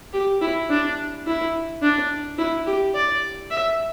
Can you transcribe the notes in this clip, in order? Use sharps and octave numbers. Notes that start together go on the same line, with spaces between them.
G4
E4
D4
E4
D4
E4
G4
D5
E5